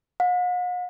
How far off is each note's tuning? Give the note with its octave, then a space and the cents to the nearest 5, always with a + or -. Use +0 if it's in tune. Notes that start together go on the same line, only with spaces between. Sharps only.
F#5 -45